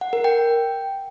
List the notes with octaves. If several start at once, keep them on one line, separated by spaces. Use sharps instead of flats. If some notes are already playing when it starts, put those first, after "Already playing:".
F#5
A#4
G5